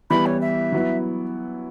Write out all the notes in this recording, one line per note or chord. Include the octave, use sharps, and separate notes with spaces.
E3 G3 B3 E4 B5
C#5
E5
F#3 B3 E4